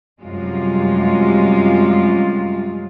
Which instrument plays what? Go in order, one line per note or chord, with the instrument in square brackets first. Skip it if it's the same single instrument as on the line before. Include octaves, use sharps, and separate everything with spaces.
[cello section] F#2 C3 G3 G#3 F4